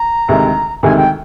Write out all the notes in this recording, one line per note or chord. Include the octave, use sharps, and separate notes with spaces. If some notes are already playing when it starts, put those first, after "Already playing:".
Already playing: A#5
D2 C3 D#3 G#3
D2 C3 D#3 G#3 G#5
G5